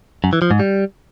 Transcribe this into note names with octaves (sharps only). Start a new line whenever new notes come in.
F#2
E3
F3
G#2
G3